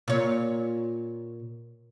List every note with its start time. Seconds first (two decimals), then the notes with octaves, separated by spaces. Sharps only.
0.08 A#2 C#5